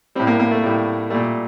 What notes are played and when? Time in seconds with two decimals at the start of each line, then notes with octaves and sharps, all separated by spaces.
0.15 G3 C4
0.20 A2
0.27 A#3
0.40 A#3
0.51 A3
0.63 A2 G3
1.10 A#2 G3 A3